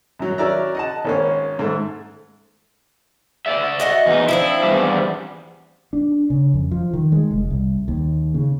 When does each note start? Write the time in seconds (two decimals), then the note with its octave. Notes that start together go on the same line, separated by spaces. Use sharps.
0.19 F#2 F#3
0.38 C#4 F#4 A#4 D5 E5 A#5
0.75 D#5 F#5 A5
1.05 G#1 A#3 C#4
1.59 G#2 A3
3.46 D5 E5
3.80 F#4 D#5 F#5
4.06 E2 D#4
4.29 F3 C4 D4 E4
4.63 E2 G3
5.93 D4
6.30 C#3
6.54 F2
6.71 F3
6.93 D#3
7.12 G#3
7.31 F1
7.50 C2
7.88 D#2
8.34 C#3